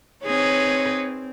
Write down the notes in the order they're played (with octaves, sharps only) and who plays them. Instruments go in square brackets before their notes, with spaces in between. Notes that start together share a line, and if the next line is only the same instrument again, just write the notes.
[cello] C4 [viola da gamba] D#4 G#4 B4 [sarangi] C#5